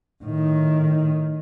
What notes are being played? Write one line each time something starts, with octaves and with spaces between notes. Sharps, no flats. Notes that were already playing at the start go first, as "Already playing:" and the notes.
A2 D#3